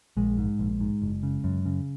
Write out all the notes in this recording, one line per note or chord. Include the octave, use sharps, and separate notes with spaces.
A#1 G#3
G#2
A#1
G#2
F#1
C#3
F#2
C#3